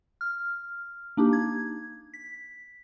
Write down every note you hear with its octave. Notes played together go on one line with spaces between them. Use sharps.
F6
A#3 D4 D#4 G4
G#6
B6